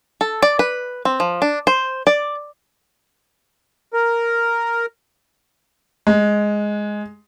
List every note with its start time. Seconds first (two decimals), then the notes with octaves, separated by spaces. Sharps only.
0.21 A4
0.42 D5
0.59 B4
1.05 C4
1.20 F3
1.42 D4
1.67 C5
2.07 D5
3.93 A#4
6.07 G#3